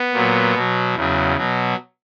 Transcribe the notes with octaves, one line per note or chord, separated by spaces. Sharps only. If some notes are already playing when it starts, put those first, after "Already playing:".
Already playing: B3
A#2 F#3
B2 F#3
E2 C#3 F#3
B2 F#3